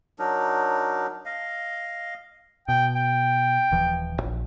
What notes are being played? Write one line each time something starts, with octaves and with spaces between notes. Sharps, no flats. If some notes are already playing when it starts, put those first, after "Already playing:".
F#3 D4 D#4 A#4
D#5 F5
B2 G5
G5
D#1 E3 F3
A#1